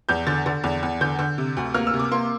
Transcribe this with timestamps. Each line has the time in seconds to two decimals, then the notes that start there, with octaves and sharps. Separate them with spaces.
0.09 E2 G6
0.27 D3 A6
0.46 D3
0.64 E2
0.83 E2
1.01 D3 G6
1.19 D3
1.38 C3
1.57 D2
1.74 A#3 F6
1.87 E6
1.94 C3
1.99 D6
2.11 A#3 C6